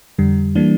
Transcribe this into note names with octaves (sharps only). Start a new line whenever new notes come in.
F2 D3 G3
E3 G3 A#3 D4